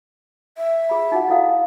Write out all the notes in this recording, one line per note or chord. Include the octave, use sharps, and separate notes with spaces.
E5
G#4 B5
D#4 F#4 F#5
E4 A4 F5